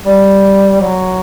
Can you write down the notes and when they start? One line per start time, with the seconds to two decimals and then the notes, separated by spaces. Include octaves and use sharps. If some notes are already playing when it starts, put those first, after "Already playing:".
0.06 G3
0.81 F#3